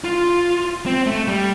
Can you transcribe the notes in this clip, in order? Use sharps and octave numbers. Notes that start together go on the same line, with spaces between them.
F4
C4
A3
G3